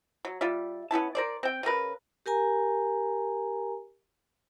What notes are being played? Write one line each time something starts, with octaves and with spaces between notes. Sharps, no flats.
F#3
G3 F4 D5 E5
B3 C#4 E4 A5
A#4 C5 D5
C4 G5
C#3 C#4 A#4 B4
G4 A#4 G#5 A#5